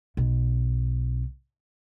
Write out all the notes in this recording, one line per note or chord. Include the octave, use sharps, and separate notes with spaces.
B1 B2